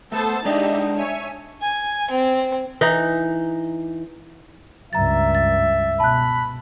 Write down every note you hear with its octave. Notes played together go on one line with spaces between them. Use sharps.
A3 B3 A4 C5 A5
G#3 D4 D#4 G4 D#5 E5
C#5 E5 G#5
G#5
C4
E3 D#4
C#2 G2 E5 A#5 A6
A6
B2 A5 B5 F#6